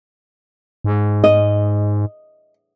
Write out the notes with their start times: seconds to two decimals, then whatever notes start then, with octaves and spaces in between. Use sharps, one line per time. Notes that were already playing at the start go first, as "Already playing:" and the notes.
0.84 G#2
1.24 D#5